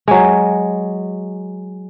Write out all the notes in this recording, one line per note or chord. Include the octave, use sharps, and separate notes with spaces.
F#3 G#3